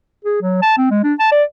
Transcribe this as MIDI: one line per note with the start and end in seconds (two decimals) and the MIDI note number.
0.25 0.37 68
0.42 0.60 54
0.62 0.74 81
0.78 0.90 60
0.91 1.01 56
1.04 1.14 62
1.20 1.29 81
1.32 1.43 74